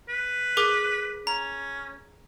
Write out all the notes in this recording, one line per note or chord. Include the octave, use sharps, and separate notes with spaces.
B4
G#4 A#4 D6
C#4 A#5